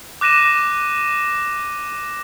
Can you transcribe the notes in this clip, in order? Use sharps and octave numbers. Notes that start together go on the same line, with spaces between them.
D6 F#6 A#6 D#7 E7